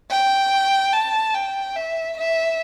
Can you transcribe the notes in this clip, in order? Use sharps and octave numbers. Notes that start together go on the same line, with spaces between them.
G5
A5
G5
E5
E5